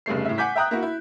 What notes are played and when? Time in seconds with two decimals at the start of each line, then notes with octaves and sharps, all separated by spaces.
0.06 F1 C#3 G3 A3 C7
0.25 A2 E5
0.38 F#5 G#5 D6 G6 B6
0.56 E5 G5 A#5 D#6 F#6
0.71 A#3 E4 F#4
0.83 E4